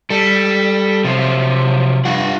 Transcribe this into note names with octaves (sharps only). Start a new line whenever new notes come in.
G3 A4
C3 F3 F#3 C5
G2 F4 F#5